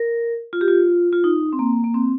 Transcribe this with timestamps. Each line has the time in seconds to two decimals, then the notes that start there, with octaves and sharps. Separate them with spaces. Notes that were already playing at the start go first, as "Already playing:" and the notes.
Already playing: A#4
0.53 F4
0.61 G4
0.68 F4
1.13 F4
1.24 D#4
1.53 C4
1.59 A#3
1.84 A#3
1.94 C4